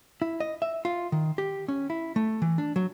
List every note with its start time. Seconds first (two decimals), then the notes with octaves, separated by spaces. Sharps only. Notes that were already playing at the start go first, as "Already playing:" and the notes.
0.22 E4
0.40 D#5
0.62 E5
0.85 F4
1.12 D#3
1.38 G4
1.68 C#4
1.90 E4
2.16 A3
2.42 E3
2.58 D4
2.76 F#3